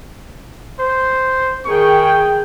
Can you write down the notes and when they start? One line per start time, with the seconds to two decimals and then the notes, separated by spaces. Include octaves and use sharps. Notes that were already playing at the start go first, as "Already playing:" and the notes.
0.80 C5
1.65 D#3 G#4 G5 C#6